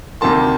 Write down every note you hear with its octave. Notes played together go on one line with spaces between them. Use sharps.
D2 C3 D#3 A#3 A5 C6